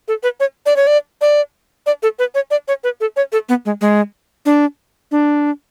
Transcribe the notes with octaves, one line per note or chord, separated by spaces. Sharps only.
A4
B4
C#5
D5
C#5
D5
D5
D5
A4
B4
C#5
D5
C#5
B4
A4
C#5
A4
B3
G#3
G#3
D4
D4